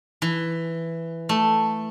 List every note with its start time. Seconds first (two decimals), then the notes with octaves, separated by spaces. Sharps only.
0.22 E3
1.29 A3